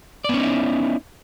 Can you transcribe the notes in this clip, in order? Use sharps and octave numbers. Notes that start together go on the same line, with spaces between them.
B3 C#4 D#4 E4 D5